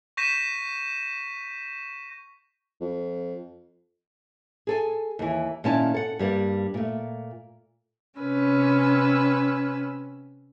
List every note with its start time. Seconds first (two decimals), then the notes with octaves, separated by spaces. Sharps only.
0.17 C#6 G6 A#6 B6 D#7 E7
2.81 F2
4.67 G#4 A4 G#5
5.19 D#2 E3
5.64 A#2 D#3 C#4 E4 A5
5.94 A4 F#5
6.19 G2 G3 A#3 D4
6.74 A#2 A3
8.20 C3 C#4 B4 E6